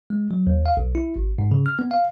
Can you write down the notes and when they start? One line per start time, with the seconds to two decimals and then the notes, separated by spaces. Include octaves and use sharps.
0.10 G#3
0.31 F#3
0.47 D#2
0.66 F5
0.77 B1
0.95 E4
1.16 G#1
1.38 G#2
1.51 C#3
1.66 F6
1.79 B3
1.91 F5